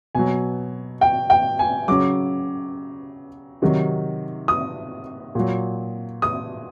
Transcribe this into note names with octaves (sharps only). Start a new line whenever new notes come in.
B2 F#3 G#5
G5
G5
G#5
C#3 F#3 D6
C3 D#3 F#3
D#6
A#2 F#3
D#6